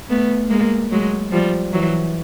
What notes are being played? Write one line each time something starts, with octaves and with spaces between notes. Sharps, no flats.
A3 B3
G#3 A#3
F#3 G#3
F3 G3
E3 F#3